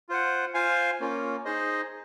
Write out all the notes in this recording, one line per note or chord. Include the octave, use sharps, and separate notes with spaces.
F4 C5 F#5
F4 C5 F5 G#5
A#3 C#4 F4
D#4 G#4 C5 D#5